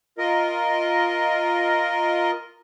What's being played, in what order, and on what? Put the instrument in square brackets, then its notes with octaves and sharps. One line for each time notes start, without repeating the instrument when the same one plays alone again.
[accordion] F4 A#4 D#5